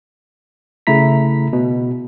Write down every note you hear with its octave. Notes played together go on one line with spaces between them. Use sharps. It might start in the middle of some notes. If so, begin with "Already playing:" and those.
C#3 A3 E4 A#5 B6
B2